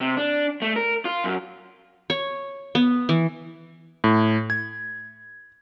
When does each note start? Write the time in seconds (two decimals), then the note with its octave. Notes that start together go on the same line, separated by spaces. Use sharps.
0.01 C3
0.17 D4
0.62 A3
0.76 A#4
1.05 F4
1.24 F#2
2.10 C#5
2.75 B3
3.09 E3
4.04 A2
4.50 G#6